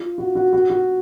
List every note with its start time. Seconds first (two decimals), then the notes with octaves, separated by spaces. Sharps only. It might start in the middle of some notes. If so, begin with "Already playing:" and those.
Already playing: F4
0.18 F#4
0.35 F#4
0.53 F#4
0.70 F#4